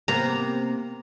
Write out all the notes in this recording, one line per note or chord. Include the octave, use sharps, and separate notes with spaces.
C3 A#3 B3 A#5